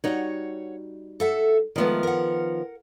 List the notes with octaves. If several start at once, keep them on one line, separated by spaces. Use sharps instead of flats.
G3 D#4 F#4 C#5 F#5
A4 E5 F#5
D#3 F3 G#3 A3 B3
A#4 F#5